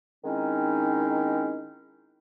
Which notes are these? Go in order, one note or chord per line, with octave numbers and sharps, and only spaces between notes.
D#3 G#3 C4 C#4 D#4 E4